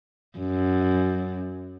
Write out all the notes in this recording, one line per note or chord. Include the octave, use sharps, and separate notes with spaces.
F#2